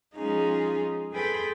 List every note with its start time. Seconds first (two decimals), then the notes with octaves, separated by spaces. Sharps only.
0.16 F3 G#3 C#4 D#4 F4 G#4
1.12 G#4 A4 B4 G5 B5 C6